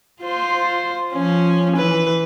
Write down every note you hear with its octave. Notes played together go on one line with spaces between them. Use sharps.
F4 C5
F3 C#4
E3 B4